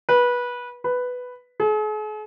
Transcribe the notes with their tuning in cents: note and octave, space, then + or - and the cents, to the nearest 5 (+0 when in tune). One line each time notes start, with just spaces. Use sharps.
B4 -20
B4 +5
G#4 +45